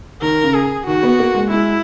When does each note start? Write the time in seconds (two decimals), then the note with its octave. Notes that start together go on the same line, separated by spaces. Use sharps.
0.22 D#3 A#4
0.43 C#3
0.54 G#4
0.87 D#3 F#4
1.03 B3
1.19 A#3
1.35 G#3
1.51 G#3 E4